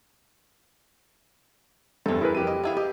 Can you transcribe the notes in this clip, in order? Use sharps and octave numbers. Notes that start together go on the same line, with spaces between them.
E2 G2 E3 A4 C5
E4 G#4 A#4 B4
F2 G4 D#7
D#5
B3 E4 F5
G4 D#5